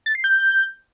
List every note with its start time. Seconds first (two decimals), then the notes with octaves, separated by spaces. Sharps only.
0.06 A6
0.15 C7
0.24 G6